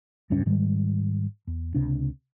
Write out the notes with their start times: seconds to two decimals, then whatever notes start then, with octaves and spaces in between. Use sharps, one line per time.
0.30 F1 C#2 G2 C#4
0.46 G#2 D#3 G3 G#3
1.47 E2
1.74 C#2 C3 D4